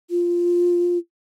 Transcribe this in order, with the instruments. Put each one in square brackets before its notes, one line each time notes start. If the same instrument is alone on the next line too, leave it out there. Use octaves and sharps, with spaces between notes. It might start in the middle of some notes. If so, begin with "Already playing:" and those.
[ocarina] F4